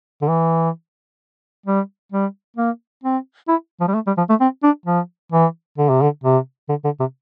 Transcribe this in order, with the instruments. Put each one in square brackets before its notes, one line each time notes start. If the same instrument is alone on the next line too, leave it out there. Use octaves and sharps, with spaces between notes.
[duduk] D3
E3
G3
G3
A#3
C4
E4
F3
G3
A3
G3
F3
A3
C4
D4
F3
E3
D3
C3
D3
C3
D3
D3
C3